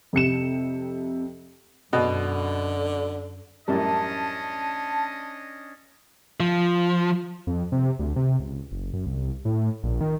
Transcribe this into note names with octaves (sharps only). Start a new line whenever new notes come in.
F2 C3 C#7 E7
F#2 B2 D3
A1 F#2 G3 C#4 D4 D#5 A5
F3
F2
C3
D2
C3
C#2
F#1
F#2
C2
A2
A#1
D#3